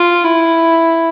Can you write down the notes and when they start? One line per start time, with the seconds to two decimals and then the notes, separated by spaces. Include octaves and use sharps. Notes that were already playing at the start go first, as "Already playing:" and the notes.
Already playing: F4
0.24 E4